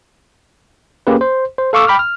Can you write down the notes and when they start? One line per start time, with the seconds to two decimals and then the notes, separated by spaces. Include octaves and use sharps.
1.07 A#3 C#4 G4 G#4 B4
1.21 C5
1.58 C5
1.73 A4 F5 C#6 D6 E6
1.87 G5 B5 D6 F6
1.99 F6